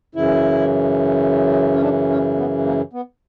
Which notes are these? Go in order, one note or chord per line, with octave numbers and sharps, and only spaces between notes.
F#2 C#3 E3 E4
C#4
D4
C#4
B3
A#3
B3